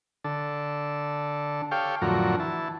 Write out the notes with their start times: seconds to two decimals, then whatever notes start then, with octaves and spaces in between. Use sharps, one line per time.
0.24 D3 A4
1.71 G4 A4 C#5 F5 G5
2.02 F2 A2 D3 F#3 F#4 A#4
2.40 E3 A5